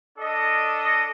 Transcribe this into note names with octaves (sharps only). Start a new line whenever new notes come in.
D4 A4 D#5